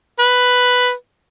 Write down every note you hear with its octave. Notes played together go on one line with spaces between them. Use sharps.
B4